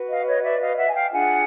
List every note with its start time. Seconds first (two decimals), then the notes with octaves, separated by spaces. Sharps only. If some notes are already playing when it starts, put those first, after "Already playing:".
Already playing: F#4 B4
0.10 D#5 F5
0.27 C#5 D#5
0.44 D5 E5
0.60 D#5 F5
0.78 E5 F#5
0.87 G#5
0.94 F5 G5
1.11 D4 F4 G#4 F#5 G#5